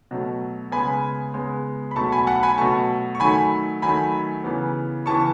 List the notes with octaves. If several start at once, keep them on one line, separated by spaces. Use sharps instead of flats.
B2 F#3 A3
C#3 G#3 B3 G#5 B5
C#3 G#3 B3
B5
B2 F#3 A3 A5 C#6
G#5 B5
F#5 A5
G#5 B5
B2 F#3 A3 A5 C#6
C#6
D#3 F#3 A3 G#5 B5
D#3 F#3 A3 G#5 B5
C#3 E3 B3
C#3 E3 B3 A5 C#6